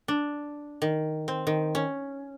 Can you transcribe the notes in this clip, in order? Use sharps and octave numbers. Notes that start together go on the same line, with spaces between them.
D4
D#3
C4
D#3
C#4